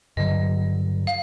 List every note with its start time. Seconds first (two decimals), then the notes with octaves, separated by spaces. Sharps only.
0.17 G2 D3 F#3 D#5
1.07 F5